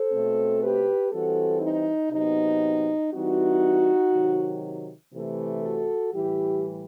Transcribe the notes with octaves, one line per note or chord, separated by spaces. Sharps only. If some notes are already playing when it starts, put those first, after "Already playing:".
Already playing: A4 C5
B2 A3 C4
G4 B4
E3 G3 C4 F#4 A4
D#4
C3 F#3 B3 D#4
E3 G3 C4 D#4 F#4
C3 D#3 F#3
C3 E3 A3
F#4 A4
A2 E3 G3 E4 G4